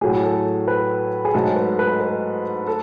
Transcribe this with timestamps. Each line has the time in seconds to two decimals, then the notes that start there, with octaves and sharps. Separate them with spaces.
0.01 A2 F#3 A3 G#4
0.23 A4
0.68 B4
1.25 G#4
1.34 G#2 F#3 A3 A4
1.56 B4
1.79 B4
2.01 B4
2.67 A4